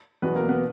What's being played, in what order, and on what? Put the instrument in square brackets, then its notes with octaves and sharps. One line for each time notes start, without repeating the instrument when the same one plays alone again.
[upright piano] E2 B2 F#3 B3 B4
A#3 A#4
B3 B4